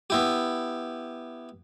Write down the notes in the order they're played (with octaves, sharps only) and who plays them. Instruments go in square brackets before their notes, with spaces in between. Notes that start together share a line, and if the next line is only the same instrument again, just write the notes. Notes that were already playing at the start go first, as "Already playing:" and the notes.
[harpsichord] B3 E4 G4